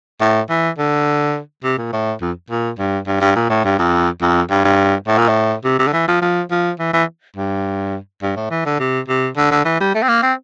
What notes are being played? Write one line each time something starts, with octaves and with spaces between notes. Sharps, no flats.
A2
E3
D3
C3
A#2
A2
F2
A#2
G2
G2
G2
A#2
A2
G2
F2
F2
G2
G2
A2
A#2
A2
C3
C3
D3
E3
F3
F3
F3
E3
E3
G2
G2
A2
E3
D3
C3
C3
D3
D3
E3
G3
A3
C4
A#3
C4